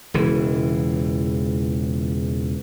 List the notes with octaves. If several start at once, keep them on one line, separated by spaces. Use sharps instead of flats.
E1 C#2 E3